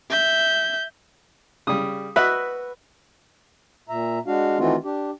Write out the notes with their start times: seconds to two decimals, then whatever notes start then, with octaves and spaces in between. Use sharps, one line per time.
0.10 E5 G6
1.67 C#3 G3 D#6
2.16 F#4 B4 D#5 E5
3.89 A#2 E5 A#5
4.27 G#3 D4 F#4 F5
4.59 D#3 E3 A3 C4 F4 F#4
4.84 D4 G4